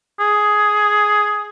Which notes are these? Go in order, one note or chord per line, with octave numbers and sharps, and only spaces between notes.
G#4